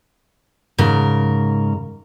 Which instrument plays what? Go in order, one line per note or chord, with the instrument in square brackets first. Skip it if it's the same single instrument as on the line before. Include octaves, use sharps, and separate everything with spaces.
[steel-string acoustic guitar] G#2 C#3 A#4